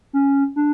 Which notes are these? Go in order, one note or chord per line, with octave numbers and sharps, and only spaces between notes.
C#4
D4